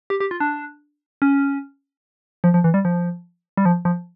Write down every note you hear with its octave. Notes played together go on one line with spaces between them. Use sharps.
G4
G4
F4
D4
C#4
F3
F3
E3
G3
F3
G3
F3
F3